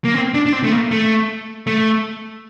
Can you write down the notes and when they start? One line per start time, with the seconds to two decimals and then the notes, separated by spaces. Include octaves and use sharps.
0.04 A#3
0.14 C4
0.34 D4
0.46 D4
0.53 C4
0.64 A3
0.72 A#3
0.91 A3
1.67 A3